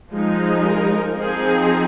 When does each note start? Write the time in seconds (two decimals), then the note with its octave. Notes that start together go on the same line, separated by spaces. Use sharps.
0.11 F3 G#3 D#4
0.64 A#4
1.18 F3 C4 D#4 G#4